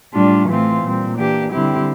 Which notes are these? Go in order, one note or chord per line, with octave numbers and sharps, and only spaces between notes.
A2 G3 D4 F4
A2 E3 A3 C4 F4
A#2 G3 C4
E3 A#3 D4 G4
D3 G3 C4 E4 G4